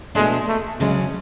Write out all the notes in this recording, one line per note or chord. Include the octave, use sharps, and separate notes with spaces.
B2 G#3 A3 D4 A4
A3
D2 C#3 F#3 G#3 C#4